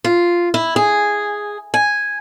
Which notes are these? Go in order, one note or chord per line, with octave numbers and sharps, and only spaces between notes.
F4
E4
G#4
G#5